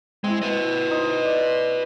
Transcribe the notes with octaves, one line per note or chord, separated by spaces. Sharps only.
G#3 C4 E4
B4 D#5
D#4 C5
D5